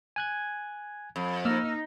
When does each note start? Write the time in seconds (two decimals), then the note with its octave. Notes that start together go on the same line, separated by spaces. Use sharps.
0.16 G#5 F#6 G#6
1.16 F2
1.45 A#3 D#4 E6 F6